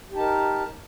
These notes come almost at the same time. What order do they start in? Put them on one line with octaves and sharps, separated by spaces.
G4 D#4 A5 A#4